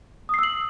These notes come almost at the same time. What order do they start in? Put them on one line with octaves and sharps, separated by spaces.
D#6 C7 E6 F#7